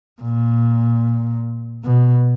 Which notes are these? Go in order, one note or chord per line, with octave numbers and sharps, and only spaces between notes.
A#2
B2